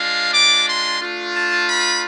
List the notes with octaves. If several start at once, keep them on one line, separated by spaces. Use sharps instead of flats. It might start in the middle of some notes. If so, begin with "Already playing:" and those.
Already playing: G#3 D4 F4 F5
D6
C6
A3 D4 F4
A5
B5